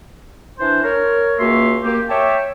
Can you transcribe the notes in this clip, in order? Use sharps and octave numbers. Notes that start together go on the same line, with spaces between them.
E3 D4 C5
A#4 C#5
C#2 A#3 F#4 E5 C6
A#3 G4
C#5 E5 G5 A5 D6